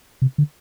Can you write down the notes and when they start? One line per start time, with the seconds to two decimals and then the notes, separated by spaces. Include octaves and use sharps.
0.22 C3
0.38 D3